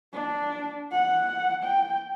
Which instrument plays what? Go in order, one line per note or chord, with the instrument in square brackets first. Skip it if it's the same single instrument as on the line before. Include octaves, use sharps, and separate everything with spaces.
[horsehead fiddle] D4
F#5
G5